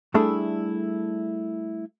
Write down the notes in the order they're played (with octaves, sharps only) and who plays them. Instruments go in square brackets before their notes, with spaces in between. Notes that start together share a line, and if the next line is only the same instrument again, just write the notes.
[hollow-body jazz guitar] G3 A3 D4 E4 G#4 A4